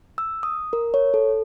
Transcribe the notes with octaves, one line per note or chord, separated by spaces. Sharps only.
E6
D#6
A#4
C#5
A4